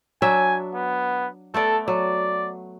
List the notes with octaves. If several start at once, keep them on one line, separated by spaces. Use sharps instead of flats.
F#3 D4 E5 G#5
B3
A3 B3 A4 D5
F#3 D5